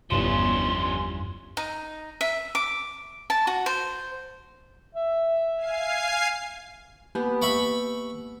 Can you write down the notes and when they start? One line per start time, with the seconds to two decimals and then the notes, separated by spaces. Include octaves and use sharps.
0.10 G1 E2 G2 F3 C#4 C6 E7
1.57 D#4
2.21 E5
2.55 D6
3.30 A5
3.47 F#4
3.66 C5
4.95 E5
5.57 F5 G#5 C7
7.15 A#3 B3 G4
7.42 E5 B5 C#6